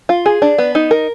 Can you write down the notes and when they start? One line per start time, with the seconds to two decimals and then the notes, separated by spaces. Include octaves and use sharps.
0.09 F4
0.26 G#4
0.42 D4
0.58 B3
0.75 D#4
0.91 A#4